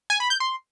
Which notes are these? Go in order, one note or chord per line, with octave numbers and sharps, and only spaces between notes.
G#5
B5
G6
C6